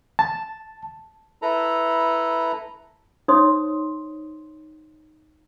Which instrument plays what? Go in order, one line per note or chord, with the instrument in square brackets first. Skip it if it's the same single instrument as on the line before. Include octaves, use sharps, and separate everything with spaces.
[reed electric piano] A5
[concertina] E4 A4 B4 A#5
[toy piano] D#4 C5 C#5 C6 D#6